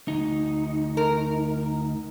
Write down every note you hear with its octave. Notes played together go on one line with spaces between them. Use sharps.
D2 D#4
A#4